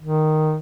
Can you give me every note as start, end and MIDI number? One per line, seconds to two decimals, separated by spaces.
0.01 0.58 51